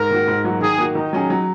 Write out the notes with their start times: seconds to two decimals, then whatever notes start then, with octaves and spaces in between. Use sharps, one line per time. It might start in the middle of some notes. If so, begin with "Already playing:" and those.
Already playing: G#2 A#4
0.10 D#3 A#3 F#4
0.28 G#2
0.44 F#3 A#3 F#4
0.61 D#3 G#4
0.78 A#3 F#4
0.95 D#3 D#4
1.13 F#3 C#4 G#4
1.30 F#3